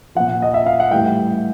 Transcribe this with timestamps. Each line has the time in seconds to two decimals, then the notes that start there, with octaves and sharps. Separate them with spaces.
0.15 A#2 F3 F#5
0.42 D#5
0.54 E5
0.66 F5
0.80 F#5
0.91 A2 E3 G3 G5